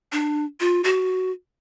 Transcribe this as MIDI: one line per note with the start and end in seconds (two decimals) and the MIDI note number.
0.12 0.45 62
0.60 0.81 65
0.84 1.31 66